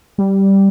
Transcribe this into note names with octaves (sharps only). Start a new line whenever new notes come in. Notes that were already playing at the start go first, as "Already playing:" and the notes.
G3